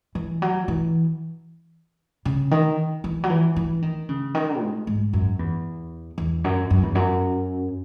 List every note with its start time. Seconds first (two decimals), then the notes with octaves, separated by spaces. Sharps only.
0.15 E3
0.42 F#3
0.68 E3
2.25 C#3
2.51 D#3
3.04 E3
3.24 F#3
3.30 E3
3.56 E3
3.82 D#3
4.09 C#3
4.35 D#3
4.61 G#2
4.87 G#2
5.13 F#2
5.39 E2
6.18 E2
6.44 F#2
6.70 F#2
6.83 E2
6.95 F#2